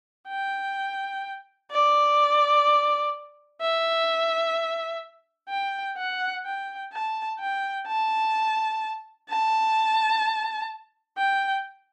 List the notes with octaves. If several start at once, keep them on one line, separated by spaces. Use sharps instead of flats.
G5
D5
E5
G5
F#5
G5
A5
G5
A5
A5
G5